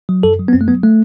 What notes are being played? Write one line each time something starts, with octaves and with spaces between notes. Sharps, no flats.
F#3
F#2 A4
F#3
B3
F#2 C4
A3
F#3 B3
A3